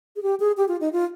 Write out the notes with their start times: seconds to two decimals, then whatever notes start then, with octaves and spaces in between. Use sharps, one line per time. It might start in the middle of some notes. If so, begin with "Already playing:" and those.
0.16 G#4
0.23 G4
0.40 G#4
0.57 G4
0.68 F4
0.81 D#4
0.93 F4